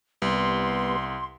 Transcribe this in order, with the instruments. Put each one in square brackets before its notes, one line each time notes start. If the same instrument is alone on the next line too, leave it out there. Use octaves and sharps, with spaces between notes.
[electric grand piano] C2 [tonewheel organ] G3 B3 B4 [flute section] C6